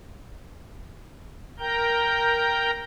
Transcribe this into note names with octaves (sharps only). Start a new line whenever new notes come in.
A#4 G5 A#5 G6